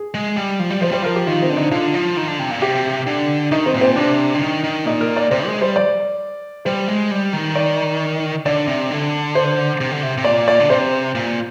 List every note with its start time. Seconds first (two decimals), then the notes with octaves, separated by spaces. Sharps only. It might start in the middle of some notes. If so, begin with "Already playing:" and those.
Already playing: G#4
0.14 G#3
0.37 G3
0.59 F3
0.70 G3
0.81 F3 C5
0.91 G3 C5
1.02 F3 A#4
1.16 G4
1.26 D#3 F4
1.42 C4
1.49 D3
1.57 D#4
1.71 D3 F4
1.94 F3
2.17 D#3
2.28 D3
2.39 C3
2.51 A#2
2.61 C3 G4
3.06 D3
3.51 D#3 D#4
3.66 C4
3.74 A#2
3.81 C4
3.96 C3 D4
4.34 D3
4.41 D#3
4.64 D#3
4.86 A#2 D#4
5.01 A#4
5.17 D5
5.31 C3 C5
5.46 G#3
5.61 G3 C5
5.76 D5
6.65 G3 C5
6.88 G#3
7.11 G3
7.33 D#3
7.56 D5
8.46 D3 D5
8.67 C3
8.91 D3
9.35 C5
9.81 C3
9.91 D3
10.03 C3
10.18 C3
10.24 A#2 D5
10.48 D5
10.60 D3
10.70 C3 C5
11.15 A#2